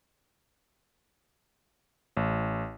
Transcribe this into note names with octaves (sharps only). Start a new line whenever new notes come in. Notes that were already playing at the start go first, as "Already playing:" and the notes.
A1